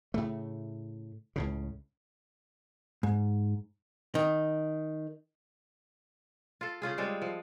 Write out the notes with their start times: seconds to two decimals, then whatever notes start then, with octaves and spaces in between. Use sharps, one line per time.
0.14 A2 C#3 A3
1.36 C#2 A2 C#3
3.03 G#2
4.15 D#3
6.61 F4 A4
6.82 C#3 C#4 F4 G#4
6.98 G3 G#3 C4 A4
7.22 F3